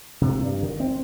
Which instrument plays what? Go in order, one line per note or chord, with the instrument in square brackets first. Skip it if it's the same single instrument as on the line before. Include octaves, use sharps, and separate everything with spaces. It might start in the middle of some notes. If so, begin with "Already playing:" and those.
[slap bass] C3
G2
D#3
C4